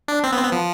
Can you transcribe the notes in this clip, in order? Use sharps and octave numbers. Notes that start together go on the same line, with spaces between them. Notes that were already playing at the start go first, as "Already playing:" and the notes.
D4
C4
B3
C4
B3
F3